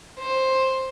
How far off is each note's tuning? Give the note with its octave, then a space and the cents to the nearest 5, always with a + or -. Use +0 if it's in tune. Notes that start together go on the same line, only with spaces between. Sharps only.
C5 +10